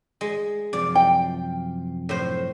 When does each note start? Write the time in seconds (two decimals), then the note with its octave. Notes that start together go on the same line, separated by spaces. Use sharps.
0.21 G#3
0.73 F#2 C3 F3 D5
0.95 G5
2.09 A2 C5